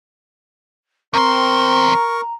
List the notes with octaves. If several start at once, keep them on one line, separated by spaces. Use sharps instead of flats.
E2 C4 A#4 A#5 C6 C#6